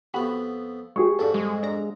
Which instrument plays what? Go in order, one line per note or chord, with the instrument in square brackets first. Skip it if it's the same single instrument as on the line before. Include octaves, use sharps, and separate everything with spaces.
[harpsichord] F2 B3 [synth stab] F#4 G4 B5
[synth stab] G#3 [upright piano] G4 G#4 C#6
[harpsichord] F2 G#2 F#4 [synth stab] D4 A4
[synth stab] G3 [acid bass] G#3
[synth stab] D4 A#5